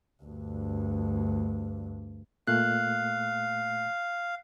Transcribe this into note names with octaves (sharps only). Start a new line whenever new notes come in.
D2 G2
A#2 A3 F5 F#6